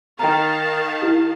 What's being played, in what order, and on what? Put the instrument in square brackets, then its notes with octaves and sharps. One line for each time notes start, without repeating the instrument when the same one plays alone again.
[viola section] D#3 F5 A5 [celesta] G5 A#5
[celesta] E4 G4